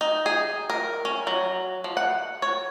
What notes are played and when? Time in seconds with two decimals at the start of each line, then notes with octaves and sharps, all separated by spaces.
0.01 D#4
0.26 G#4
0.70 A#4
1.05 C#4
1.27 F#3
1.84 F3
1.97 F#5
2.42 C#5